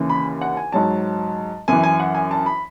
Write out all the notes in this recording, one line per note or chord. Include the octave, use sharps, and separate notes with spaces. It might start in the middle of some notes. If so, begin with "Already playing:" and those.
Already playing: D#2 C#3 E3
B5
F#5
G#5
G#2 F#3 A5
F#2 E3 G#5
G#5
F#5
G#5
A5
B5